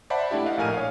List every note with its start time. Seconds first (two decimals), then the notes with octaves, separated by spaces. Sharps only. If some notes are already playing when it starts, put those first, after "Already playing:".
0.10 C5 D5 E5 F#5 A5 B5
0.31 A3 D4 E4 G4
0.46 D5 D#5 F5 F#5
0.57 A#1 A2 A#4 G#5 F6 D#7
0.74 C#5 F5